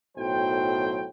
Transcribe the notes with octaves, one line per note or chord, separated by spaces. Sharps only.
B1 A2 F#3 C5 G5